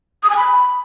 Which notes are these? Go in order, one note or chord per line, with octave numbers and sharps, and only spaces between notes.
D#6
G#5
B5